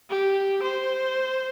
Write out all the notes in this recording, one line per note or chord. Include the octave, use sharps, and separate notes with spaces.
G4
C5